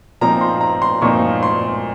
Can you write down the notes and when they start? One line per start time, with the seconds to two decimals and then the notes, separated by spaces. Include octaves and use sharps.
0.21 A#2 F3 C4 D#4 A#5
0.41 C6
0.61 A#5
0.82 C6
1.02 A#2 F3 C4 D#4 C#6
1.43 C6